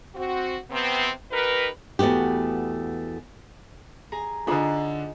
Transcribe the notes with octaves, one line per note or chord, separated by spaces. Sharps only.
C4 F#4
C3 B3 C4
D#4 G4 A#4 B4
E2 A3 B3 F#4 G4
G#4 G#5 A#5
D3 D4 D#4 F4 G#4 A4 A#5